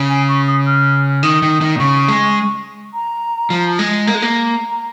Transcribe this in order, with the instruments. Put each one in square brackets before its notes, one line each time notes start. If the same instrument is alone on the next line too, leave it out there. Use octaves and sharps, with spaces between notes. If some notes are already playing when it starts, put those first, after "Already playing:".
Already playing: [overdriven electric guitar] C#3
[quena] G#5
C#6
D#6
F6
[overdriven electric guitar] D#3 [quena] D#6
[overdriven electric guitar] D#3
D#3
A#2
[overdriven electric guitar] C#3 [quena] C#6
[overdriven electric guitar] G#3
[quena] A#5
[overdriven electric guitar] F3
G#3
[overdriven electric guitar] A#3 [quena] A#5
[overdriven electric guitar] G#3
A#3